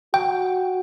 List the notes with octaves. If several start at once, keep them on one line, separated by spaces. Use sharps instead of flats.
F#4 G5